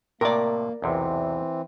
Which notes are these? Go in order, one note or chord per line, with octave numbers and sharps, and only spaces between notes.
A2 C3 A#3 A#4 D5
B1 E2 C3 E3 C4